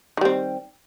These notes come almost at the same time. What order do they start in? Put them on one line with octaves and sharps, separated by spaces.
D#3 G3 C4